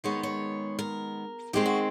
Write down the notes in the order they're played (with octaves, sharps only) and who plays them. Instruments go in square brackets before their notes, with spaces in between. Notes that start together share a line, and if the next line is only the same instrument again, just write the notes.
[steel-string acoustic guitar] D#3 G#3 B3 C#5
C#5
A#4
D#3 G#3 C4 G4
F#4